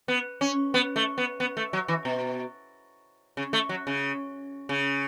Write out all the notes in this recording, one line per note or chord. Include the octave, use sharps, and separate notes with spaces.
B3
C#4
B3
A3
B3
B3
A3
F#3
E3
B2
C#3
A3
F#3
C#3
C#3